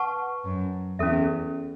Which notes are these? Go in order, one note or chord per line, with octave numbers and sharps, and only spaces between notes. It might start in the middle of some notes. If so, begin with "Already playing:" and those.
Already playing: B4 F#5 A5 C#6
F#2
E2 C#4 A4 E5